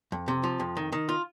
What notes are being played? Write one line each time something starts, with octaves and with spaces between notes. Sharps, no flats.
F2
C3
F3
F2
D#3
D#3
F4